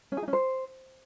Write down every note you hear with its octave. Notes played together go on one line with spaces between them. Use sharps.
C#4
G#4
D#4
C#4
C5